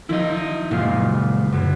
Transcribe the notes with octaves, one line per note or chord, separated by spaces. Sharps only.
D#3 F3 E4 D#5
F#1 C#2 A#2 F4 F5
F#2 D3 B3